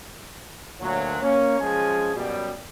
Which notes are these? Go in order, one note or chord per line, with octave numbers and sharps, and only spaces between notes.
D2 A#2 F#3
A#3 C#4
F3 G#3 C#4 G#4 G#5
F#2 B2 G3